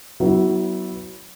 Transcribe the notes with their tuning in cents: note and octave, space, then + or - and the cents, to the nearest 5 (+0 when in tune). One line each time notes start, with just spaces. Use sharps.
F#3 +25 B3 +0 E4 -15